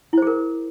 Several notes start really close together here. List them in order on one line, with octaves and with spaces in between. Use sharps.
E4 C5 G#4 A#4